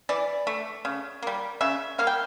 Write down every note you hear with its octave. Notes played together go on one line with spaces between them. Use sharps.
E3 D5
A3
C#3
G3 A#3
C#3 E5
G3 A#3 F5
G5